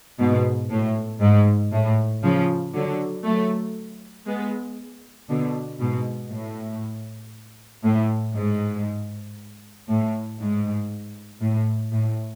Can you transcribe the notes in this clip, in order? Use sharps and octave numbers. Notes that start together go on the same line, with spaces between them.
G#2 B2
A2
G#2
A2
C#3 F3
D3 F#3
F#3 A3
G#3 B3
B2 D3
G#2 B2
A2
A2
G#2
A2
G#2
A2
A2